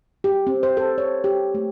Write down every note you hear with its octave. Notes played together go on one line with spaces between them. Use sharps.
G4
C4
C5
A4
C#5
G4
A3